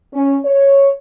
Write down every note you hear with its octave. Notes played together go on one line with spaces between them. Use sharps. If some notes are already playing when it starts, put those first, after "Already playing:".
C#4
C#5